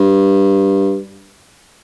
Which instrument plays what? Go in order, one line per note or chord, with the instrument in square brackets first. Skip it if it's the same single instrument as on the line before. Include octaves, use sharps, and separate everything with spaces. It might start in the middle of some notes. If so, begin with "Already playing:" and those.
Already playing: [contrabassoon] G2